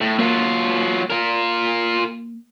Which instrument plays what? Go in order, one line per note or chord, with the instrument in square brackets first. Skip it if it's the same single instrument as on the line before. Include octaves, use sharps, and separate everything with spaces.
[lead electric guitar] A2
[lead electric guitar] F#3 F4 [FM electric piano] A#3
[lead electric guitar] F4 A#4